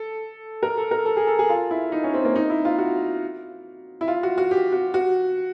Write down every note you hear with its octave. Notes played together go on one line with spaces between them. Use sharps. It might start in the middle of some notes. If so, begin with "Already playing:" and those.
Already playing: A4
A#4
A4
A#4
A4
G#4
A4
G#4
F4
E4
D#4
C#4
C4
A#3
D#4
E4
F4
F#4
E4
F4
F#4
F#4
G4
F#4
F#4